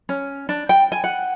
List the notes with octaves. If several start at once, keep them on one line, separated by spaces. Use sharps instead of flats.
C#4
D4
G5
G#5
F#5